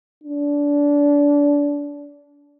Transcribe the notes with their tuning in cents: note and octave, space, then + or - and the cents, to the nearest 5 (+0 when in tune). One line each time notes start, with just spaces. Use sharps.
D4 -25